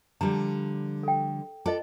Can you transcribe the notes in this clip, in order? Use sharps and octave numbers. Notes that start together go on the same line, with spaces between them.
D3 F3 G3 A#5
A4 G5
F4 A4 C5 D5 D#5